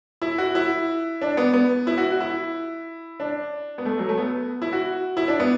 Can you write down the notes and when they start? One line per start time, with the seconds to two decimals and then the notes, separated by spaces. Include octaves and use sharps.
0.22 E4
0.38 F#4
0.55 E4
1.21 D4
1.37 B3
1.53 B3
1.87 E4
1.98 F#4
2.12 F#4
2.20 E4
3.20 D4
3.78 B3
3.85 A3
3.99 F#3
4.09 A3
4.18 B3
4.62 E4
4.73 F#4
5.17 E4
5.28 D4
5.40 B3